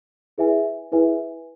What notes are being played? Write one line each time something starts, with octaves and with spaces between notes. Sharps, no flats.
E4 G#4 B4 E5 G#5
E4 G#4 B4 E5 G#5